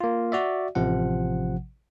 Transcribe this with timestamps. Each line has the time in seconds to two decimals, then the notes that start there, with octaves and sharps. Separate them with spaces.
0.01 A#3 F4
0.32 F#4 D5 E5
0.75 A1 C3 F3 F#5